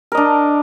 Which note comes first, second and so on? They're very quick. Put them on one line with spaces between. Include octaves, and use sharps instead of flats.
A#4 D#5 D4